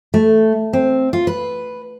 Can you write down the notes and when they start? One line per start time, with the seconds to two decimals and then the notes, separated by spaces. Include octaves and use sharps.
0.14 A3
0.73 C4
1.13 F4
1.27 B4